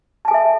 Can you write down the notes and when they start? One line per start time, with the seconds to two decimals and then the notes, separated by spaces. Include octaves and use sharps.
0.25 A5
0.28 G#5
0.31 A4
0.34 E5